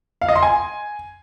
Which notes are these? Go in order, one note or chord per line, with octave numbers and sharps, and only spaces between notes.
F5
D#5
C6
G#5